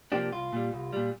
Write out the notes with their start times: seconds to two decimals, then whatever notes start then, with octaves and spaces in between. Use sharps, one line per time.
0.12 C3 F3 A#3 D4 G4
0.32 C2 F4
0.53 A#2 G3
0.73 C2
0.93 A#2 G3